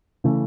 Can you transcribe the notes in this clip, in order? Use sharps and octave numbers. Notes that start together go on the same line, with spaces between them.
C#3 E3 A3